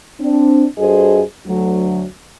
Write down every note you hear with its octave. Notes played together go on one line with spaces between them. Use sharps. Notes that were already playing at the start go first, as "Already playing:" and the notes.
C4 D4
G2 F#4 G#4 A4 C5 D#5
D2 F#3